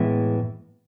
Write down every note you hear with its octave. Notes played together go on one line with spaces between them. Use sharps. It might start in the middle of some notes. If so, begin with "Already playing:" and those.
Already playing: A2 E3 G#3 B3